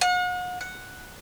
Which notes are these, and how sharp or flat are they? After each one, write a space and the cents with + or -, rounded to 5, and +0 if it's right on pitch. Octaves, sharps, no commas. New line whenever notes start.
F#5 -40
F#5 +0